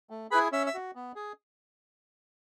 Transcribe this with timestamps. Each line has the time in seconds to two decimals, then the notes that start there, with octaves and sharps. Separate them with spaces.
0.10 A3
0.31 G#4 B4 B5
0.35 E4
0.52 C#4 E5 E6
0.67 E5 E6
0.74 F#4
0.95 B3
1.16 G#4